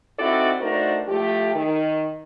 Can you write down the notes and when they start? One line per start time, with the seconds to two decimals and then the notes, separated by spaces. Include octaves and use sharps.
0.19 C4 D#4 E4 F#4 A4 D5
0.60 A3 D4 D#4 F#4 A#4 C5
1.08 A2 F3 A3 G4
1.55 D#3